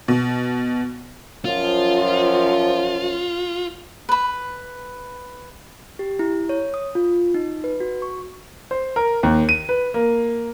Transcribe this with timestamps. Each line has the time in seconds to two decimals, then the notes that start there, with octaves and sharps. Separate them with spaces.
0.08 B2
1.45 F#2 F3 F4
4.09 B4 B5
5.99 G4
6.19 E4
6.49 C#5
6.74 D#6
6.95 F4
7.34 D#4
7.64 B4
7.80 F#4
8.02 C#6
8.71 C5
8.96 A#4
9.23 D#2
9.49 D#7
9.69 B4
9.94 A#3